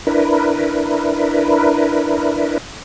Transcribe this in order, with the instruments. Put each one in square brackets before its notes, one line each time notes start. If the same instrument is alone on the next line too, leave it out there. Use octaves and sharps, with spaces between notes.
[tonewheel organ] D4 E4 A#4 B4